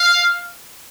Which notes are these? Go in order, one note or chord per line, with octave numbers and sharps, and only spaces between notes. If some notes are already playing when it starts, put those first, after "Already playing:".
Already playing: F5